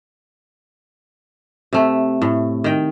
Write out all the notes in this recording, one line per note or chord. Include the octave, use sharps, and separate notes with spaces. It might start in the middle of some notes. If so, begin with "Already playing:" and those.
C3 A3
A2
D#3 G5